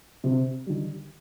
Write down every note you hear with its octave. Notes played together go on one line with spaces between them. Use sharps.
C3
D#3 G3